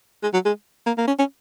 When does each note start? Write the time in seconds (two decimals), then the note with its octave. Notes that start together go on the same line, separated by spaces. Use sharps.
0.23 G#3
0.33 F#3
0.45 G#3
0.87 A#3
0.98 A#3
1.07 C#4
1.19 C#4